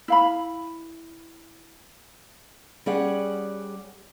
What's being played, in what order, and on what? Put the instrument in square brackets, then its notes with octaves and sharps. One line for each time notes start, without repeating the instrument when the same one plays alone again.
[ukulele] E4 F5 B5
[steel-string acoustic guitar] G3 C#4 G#4 D5 F#5